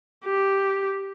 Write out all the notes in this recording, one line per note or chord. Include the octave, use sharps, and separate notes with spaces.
G4